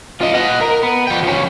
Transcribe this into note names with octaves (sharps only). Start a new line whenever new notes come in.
F4 D#5
D#5 F#5
A#4
B3
F3 G5
F3 C#4